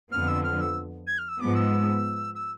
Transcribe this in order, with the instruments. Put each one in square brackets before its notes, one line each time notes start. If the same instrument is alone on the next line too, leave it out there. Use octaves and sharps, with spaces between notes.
[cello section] F2 D3 F3 B3 [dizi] F6
[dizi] E6
F6
E6
G#6
F6
E6
[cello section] G#2 F3 G#3 B3 [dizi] D6
[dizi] E6
E6